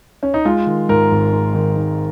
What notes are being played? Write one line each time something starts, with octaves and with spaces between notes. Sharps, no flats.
C#4
D#4
G#3 F4
D#3
G#2 A#4
G#1
G#3
D#3
G#2